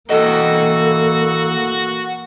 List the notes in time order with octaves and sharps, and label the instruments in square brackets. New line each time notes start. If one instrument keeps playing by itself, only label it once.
[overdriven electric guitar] E3 D#5 [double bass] A#3 [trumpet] F#4 [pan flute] A4